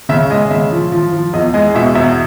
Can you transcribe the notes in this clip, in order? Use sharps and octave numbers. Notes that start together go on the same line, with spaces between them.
C#3 E5
G#3 D#5
C#3 E5
F3
F3
F3
E2 D#5
G#3 D#5
B2 E5
E2 E5